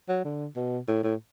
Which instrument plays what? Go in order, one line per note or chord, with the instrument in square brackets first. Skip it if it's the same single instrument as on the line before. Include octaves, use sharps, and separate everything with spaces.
[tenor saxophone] F#3
D3
B2
A2
A2